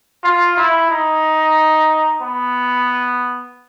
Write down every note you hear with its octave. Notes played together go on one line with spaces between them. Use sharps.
F4
E4
D#4
B3